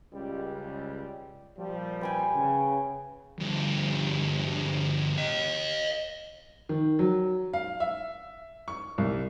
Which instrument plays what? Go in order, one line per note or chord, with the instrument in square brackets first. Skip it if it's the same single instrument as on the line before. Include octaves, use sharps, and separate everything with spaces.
[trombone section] C#2 G3
A#2 F3 G3
[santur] B4 G5 G#5
[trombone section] C#3
[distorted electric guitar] D2 G2
D#5 F5
[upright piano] D#3
F#3
F5
E5
C#6
C2